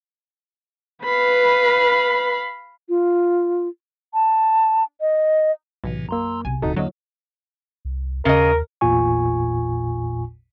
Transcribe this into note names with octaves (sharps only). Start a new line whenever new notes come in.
B4 F5 B5
F4
A5
D#5
B1 A2 C3 E3
F#2 A#3 A#5 C6 E6
B1 C3 G#5
D1 A#2 D3 D#4 E4 F#4 A4
E2 D3 F#3 A#3 E4 D#5
C2
D#2 C#3 A#4 D#5
A1 E2 A#2 F4 G#5 C#6